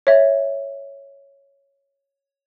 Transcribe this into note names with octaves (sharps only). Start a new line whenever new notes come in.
C#5 E5